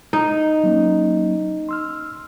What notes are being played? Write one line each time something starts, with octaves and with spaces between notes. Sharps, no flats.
D#4
F#3 A#3 C#4
C6 E6 F6